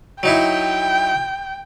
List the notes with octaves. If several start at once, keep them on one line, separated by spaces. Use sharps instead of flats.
F#3 D#4 E4 G5